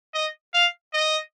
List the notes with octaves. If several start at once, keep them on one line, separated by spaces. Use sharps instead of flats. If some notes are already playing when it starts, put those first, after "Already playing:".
D#5
F5
D#5